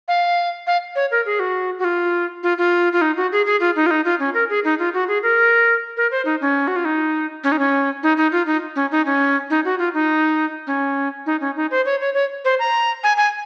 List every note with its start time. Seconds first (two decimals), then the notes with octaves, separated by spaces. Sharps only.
0.08 F5
0.67 F5
0.95 C#5
1.11 A#4
1.26 G#4
1.40 F#4
1.79 F#4
1.84 F4
2.43 F4
2.58 F4
2.93 F4
3.01 D#4
3.17 F#4
3.32 G#4
3.46 G#4
3.60 F4
3.76 D#4
3.86 F4
3.91 D#4
4.05 F4
4.20 C#4
4.34 A#4
4.49 G#4
4.64 D#4
4.79 F4
4.94 F#4
5.08 G#4
5.23 A#4
5.97 A#4
6.11 C5
6.25 D#4
6.41 C#4
6.68 F#4
6.76 F4
6.85 D#4
7.44 C#4
7.52 D#4
7.59 C#4
8.03 D#4
8.17 D#4
8.32 F4
8.46 D#4
8.76 C#4
8.91 D#4
9.06 C#4
9.50 D#4
9.65 F#4
9.79 F4
9.94 D#4
10.67 C#4
11.26 D#4
11.41 C#4
11.56 D#4
11.71 C5
11.85 C#5
12.00 C#5
12.14 C#5
12.45 C5
12.59 A#5
13.04 G#5
13.17 G#5